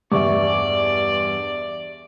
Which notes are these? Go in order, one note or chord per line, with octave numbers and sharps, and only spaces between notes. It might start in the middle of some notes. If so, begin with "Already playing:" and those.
E2 G2 D5 E5 C#6 D6